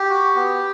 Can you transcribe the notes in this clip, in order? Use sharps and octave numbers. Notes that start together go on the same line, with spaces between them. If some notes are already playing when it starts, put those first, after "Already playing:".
Already playing: G4
F#4
B3